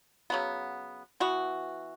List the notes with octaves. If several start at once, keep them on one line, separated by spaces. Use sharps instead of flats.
C#3 F#3 B3
E3 B3 F#4